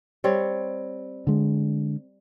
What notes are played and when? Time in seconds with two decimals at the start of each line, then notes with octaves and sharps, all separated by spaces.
0.24 G3 C4 C#5
1.27 D3 G#3